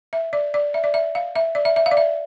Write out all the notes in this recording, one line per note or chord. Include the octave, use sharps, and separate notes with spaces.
E5
D5
D5
E5
D5
E5
F5
E5
D5
E5
E5
F5
D5
E5